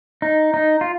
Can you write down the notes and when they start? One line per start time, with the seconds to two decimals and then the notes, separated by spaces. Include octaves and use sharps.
0.22 D#4
0.54 D#4
0.81 F4